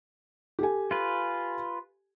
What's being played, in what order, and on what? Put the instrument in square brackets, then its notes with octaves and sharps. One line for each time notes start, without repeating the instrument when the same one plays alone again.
[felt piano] G4 A4 G#5
[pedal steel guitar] F4 B4